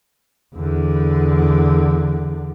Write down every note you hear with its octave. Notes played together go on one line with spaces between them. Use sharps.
E2 D3